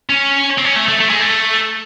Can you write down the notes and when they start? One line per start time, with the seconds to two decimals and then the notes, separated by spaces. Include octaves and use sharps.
0.10 C#4
0.58 C4
0.64 C#4
0.76 A3
0.88 A3
1.00 A3
1.10 G#3
1.20 A3